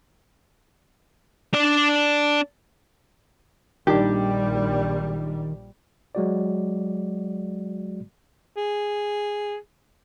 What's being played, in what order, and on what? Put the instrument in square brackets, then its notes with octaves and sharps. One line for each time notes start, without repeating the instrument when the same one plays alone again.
[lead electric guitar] D4 D5
[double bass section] A#1 G3 [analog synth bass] D#3 [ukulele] D4 G4
[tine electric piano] F#3 G#3 F#4 D5
[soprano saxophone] G#4